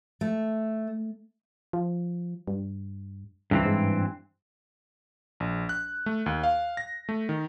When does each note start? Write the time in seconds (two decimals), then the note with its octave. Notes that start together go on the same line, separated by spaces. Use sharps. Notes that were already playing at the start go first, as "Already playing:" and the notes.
0.21 A3
1.73 F3
2.48 G2
3.51 C#2 G2 E3 C4
3.65 G#2
5.40 A#1
5.69 F#6
6.06 A3
6.26 D#2
6.44 F5
6.77 A#6
7.09 A3
7.29 D#3